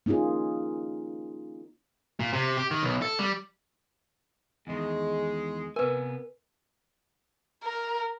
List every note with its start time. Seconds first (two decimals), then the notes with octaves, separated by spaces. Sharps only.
0.06 A#3 C#4 D#4 F4 G#4
2.20 A#2
2.33 C3
2.57 G4
2.71 D#3
2.83 B1
3.02 A4
3.19 G3
4.67 E2 D#3 G#3
5.76 C3 B3 A#4 B4 G#5
7.64 A#4